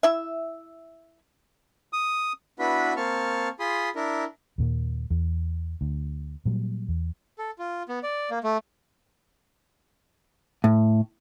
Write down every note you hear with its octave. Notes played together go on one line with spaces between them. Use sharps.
E4 E5
D#6
B3 D4 E4 F#4 B4 B5
A#3 C4 A5 C#6 F6
F4 G#4 B5 C6 D#6
D4 E4 A#4
D#2 A#2 A#3
E2
D2
A#2 F#3 G3
E2
A4
F4
B3
D5
A#3
A3
A2